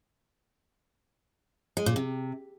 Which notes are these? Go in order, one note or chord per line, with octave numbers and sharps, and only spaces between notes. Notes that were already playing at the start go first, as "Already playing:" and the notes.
G#3
A#2
C3